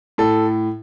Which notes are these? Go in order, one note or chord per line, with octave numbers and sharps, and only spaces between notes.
A2 A4